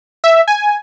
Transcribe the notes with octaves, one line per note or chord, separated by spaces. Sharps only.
E5
G#5